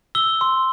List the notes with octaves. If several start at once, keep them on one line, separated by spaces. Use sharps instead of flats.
E6 G7
C6